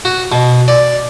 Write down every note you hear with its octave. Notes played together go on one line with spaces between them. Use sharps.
F#4
B2
D5